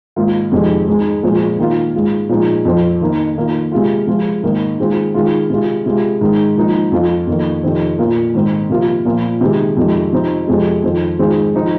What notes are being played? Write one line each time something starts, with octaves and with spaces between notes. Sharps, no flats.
G#2 D#3 A#3 F4
F2 C3 D#3 G#3
G#2 G#3 D#4
A#2 F3 G#3 C4
D#3 A#3 F4
G#2 G#3 F4
A#2 F3 G#3 D#4
F2 F3 C4
D#3 A#3 D#4
D#3 A#3 F4
C3 G#3 F4
C3 F3 G#3 F4
G#2 D#3 A#3 D#4
D#3 G#3 C4 F4
D#3 G#3 F4
C3 G#3 F4
C3 G#3 F4
G#2 D#3 G#3 D#4
G#2 F3 A#3 D#4
F2 F3 C4 F4
F2 D#3 A#3
F2 C3 D#3 C4
A#2 A#3 F4
G#2 D#3 C4 D#4
C3 F3 A#3 F4
A#2 F3 A#3 F4
C3 D#3 G#3 C4
F2 C3 D#3 G#3
C3 F3 C4 D#4
F2 C3 G#3
F2 D#3 C4 F4
G#2 D#3 G#3 C4 F4
F3 C4 D#4